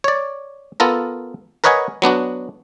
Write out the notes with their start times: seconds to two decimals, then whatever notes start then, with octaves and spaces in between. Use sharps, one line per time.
0.04 C#5 D5
0.80 B3 F4 A4 A#4
1.64 A#4 B4 C#5 D#5 F#5 G#5
2.02 F#3 B3 D4 F#4